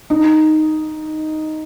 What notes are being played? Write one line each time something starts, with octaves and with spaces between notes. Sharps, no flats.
D#4